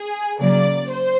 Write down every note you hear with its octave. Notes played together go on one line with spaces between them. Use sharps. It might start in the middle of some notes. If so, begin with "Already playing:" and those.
Already playing: G#4
C#3 F#3 A#3 D5
C5